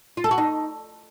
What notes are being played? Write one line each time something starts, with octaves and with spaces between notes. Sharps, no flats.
F4
A4
F#4
D#4